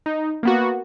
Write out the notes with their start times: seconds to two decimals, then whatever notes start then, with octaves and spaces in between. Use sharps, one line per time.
0.06 D#4
0.43 A#3 B3 F#4